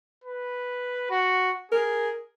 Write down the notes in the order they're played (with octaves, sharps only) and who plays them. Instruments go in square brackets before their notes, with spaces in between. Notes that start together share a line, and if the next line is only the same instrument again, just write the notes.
[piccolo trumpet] B4
F#4
[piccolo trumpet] G#4 [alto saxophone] A#4